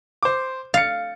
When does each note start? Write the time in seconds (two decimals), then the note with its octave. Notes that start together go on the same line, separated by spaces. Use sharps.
0.23 C5 D6
0.74 F5 A6 C#7